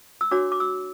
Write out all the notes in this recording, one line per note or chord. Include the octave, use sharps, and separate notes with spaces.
E6
D4 F#4 C#5 D6
D6
E6